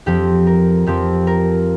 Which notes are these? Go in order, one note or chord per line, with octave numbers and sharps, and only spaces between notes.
F2 F3 C4 G4
A#4
F2 F3 C4 G4
A#4